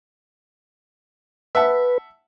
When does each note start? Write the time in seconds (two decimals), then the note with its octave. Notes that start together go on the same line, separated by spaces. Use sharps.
1.55 B4 E5 F#5 A5